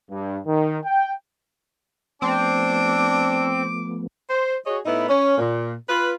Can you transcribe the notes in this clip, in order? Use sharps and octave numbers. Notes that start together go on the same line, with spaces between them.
G2
D#3
G5
F3 A3 B3 C4 D4 D6
C5
F#4 G#4 C#5 D#5
A2 B3 D#4 E4
C#4
A#2
F4 B4